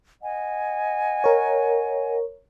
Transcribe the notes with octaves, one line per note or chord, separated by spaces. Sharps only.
D#5 F#5 G#5
A#4 C#5